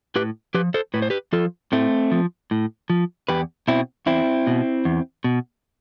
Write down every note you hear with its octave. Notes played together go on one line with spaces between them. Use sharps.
A2 G4 B4
F3 G4 B4
A4 C5
A2 B4
C5
G4 B4
F3 F4 A4
A2 A3 C4
F3
A2
F3
E2 G4 B4
B2 C4 E4
E2 C4 E4
B2
E2
B2